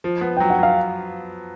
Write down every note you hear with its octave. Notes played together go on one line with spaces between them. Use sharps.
F3
B3
F#3 G5
F#5
F#3 F5